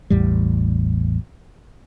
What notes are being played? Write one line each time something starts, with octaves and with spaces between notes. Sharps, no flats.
A1 E2 A2 G3